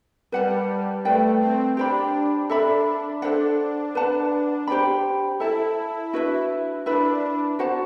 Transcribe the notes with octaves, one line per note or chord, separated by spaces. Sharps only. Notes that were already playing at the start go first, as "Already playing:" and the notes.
G3 B4 F#5 A5
A3 B4 D5 G5
C4
D4 G4 C5 G5 B5
D4 A4 E5 B5
D4 A4 C5 F#5
B4 F#5 A5
G4 C5 G5 B5
E4 A4 E5 A5
D4 F#4 B4 E5
D4 E4 B4 E5 B5
F#4 C5 F#5 A5